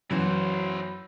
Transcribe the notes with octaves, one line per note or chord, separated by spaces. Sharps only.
F#2 E3 F#3 E4 C5